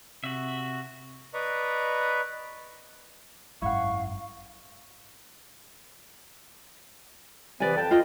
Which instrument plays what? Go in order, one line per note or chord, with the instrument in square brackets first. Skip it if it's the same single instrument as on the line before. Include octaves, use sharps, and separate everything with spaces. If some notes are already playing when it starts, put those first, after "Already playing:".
[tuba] C3 [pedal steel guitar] F#4 E5
[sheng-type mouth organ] B4 D5 D#5 A#5 B5 C#6
[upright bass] G#1 F#2 [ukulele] E4 F#5 [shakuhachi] F5 [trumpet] C#6
[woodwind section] C3 E3 B3 [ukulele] D5 G#5
[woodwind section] F2 G5 A5
[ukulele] F4 D#5